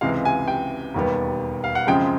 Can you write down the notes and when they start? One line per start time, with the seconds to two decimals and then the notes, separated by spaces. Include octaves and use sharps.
0.01 C#2 C3 E3 G#3 F5
0.25 G#5
0.48 G5
0.94 E1 D#2 D#3 G3 B3
1.64 F5
1.75 F#5
1.87 F#2 C#3 F3 G#3 C4 G5